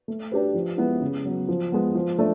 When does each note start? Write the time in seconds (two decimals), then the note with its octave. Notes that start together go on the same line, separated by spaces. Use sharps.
0.08 A3
0.31 D4 G4 B4
0.54 F3
0.77 G#3 B3 E4
1.01 C#3
1.24 F#3 B3
1.49 F3
1.72 G#3 B3
1.95 F3
2.19 A3 D4